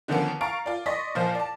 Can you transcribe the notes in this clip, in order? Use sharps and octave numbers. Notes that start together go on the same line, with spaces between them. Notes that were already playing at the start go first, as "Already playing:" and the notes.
D3 D#3 F3 A#3 B3 C#4
F5 A#5 C#6 A6 D7
F4 D5
D5 D#5 C6 C#6 A#6 B6
A#2 F3 C5 F5
D5 A5